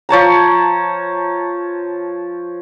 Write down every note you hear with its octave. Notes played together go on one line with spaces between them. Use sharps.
F3 C#5 A5 A#5